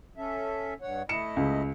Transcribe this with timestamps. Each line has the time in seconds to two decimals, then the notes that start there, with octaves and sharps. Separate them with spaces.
0.17 C#4 A4 E5
0.81 G2 C#5 F#5
1.09 A3 E4 D#5 C#7 E7
1.37 C#2